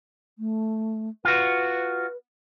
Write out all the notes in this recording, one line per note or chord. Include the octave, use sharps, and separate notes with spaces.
A3
F4 F#4 B4